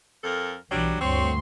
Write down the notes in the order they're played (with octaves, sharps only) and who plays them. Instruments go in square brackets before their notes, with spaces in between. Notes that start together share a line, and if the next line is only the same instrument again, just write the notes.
[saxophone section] F2 A4 A#4
[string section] B1 E3 [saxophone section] F#3 G3 D4
[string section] D2 G2 C6 [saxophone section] C4 C#5